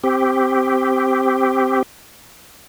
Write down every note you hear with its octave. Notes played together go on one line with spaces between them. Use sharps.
C4 G4